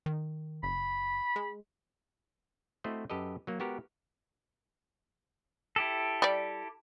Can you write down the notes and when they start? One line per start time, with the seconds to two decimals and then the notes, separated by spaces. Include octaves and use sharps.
0.06 D#3
0.63 F#1 B5
1.36 G#3
2.84 A3 C4 E4 F#4 C5 D#5
3.10 F#2 G4 A4 B4 D#5
3.47 F#3 A#3
3.59 G#3 B3 F#4 G4 A#4
5.76 E4 G4 A4
6.22 G3 D5